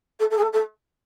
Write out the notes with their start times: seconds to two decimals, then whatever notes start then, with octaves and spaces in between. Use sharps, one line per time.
0.19 A4
0.30 A4
0.37 G#4
0.42 A4
0.52 A4